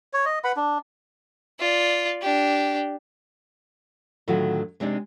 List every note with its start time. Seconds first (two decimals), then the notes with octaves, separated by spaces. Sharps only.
0.13 C#5
0.25 D#5
0.44 B4 F#5 B5
0.57 D4
1.60 F4 D5
2.22 D4 G4
4.28 A2 D3 D#3 F#3 F4 F#4
4.80 C3 G#3 C4 D4 D#4